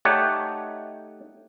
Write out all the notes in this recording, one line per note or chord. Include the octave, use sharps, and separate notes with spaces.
A3 D#4 G4 C#5 D5 F#5